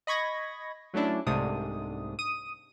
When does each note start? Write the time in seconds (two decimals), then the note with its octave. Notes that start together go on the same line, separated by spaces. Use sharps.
0.07 D#5 B5 C#6 G#6 A#6
0.94 F#3 A3 C#4 D4 E4
1.27 C2 G#2 C3 A3 D4 D#6
2.19 D#6 D#7